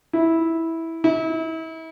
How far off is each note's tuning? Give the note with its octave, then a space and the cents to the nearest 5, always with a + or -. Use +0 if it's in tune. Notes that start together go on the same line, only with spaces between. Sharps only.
E4 -10
E4 -35